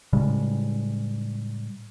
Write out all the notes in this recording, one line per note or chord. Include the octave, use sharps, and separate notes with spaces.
A2 C#3 G3 G#3